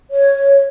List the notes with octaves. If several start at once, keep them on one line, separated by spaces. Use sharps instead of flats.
C#5